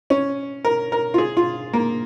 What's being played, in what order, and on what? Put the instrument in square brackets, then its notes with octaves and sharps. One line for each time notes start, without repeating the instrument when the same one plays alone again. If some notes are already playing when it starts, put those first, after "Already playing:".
[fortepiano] C#4
A#4
A#4
F4
G#4
F4
A#3